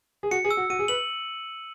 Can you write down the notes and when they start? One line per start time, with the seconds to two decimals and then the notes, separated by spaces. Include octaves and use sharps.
0.23 G#4
0.31 F#4 C#7
0.45 G#4
0.51 E6
0.57 F#4
0.70 F#4 D#7
0.79 G#4
0.88 B4 F#7